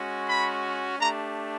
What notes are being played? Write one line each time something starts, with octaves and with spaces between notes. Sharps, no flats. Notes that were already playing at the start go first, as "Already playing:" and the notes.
Already playing: G#3 C#4 F#4
B5
A3 D4 G4 A#5